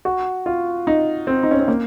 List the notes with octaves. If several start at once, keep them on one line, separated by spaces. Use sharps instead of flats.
F#4
F4
D#4
C4
D#4
C#4
C4
A#3